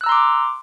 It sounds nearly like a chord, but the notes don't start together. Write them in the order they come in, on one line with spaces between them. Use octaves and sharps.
F#6 E6 A#5 C6 D6